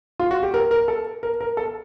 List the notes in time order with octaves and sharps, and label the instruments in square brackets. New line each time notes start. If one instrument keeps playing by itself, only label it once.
[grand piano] F4
F#4
G4
A#4
A#4
A4
A#4
A#4
A4